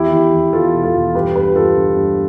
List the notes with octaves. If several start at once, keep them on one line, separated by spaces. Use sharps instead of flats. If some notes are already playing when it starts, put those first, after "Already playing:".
Already playing: E2 E4 G4
E2
E2
E2 F4 A4
B2
F4 A4
E2
G2 G4 B4
G2 G4 B4
G2 F4 A4
D3
G2